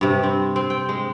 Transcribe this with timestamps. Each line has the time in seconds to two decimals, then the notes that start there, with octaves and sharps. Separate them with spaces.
0.01 G2 C3
0.23 C4
0.56 C4
0.70 G5
0.89 G#3